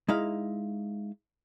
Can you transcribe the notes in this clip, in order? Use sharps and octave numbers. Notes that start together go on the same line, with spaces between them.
G#3 D#4 E4 F5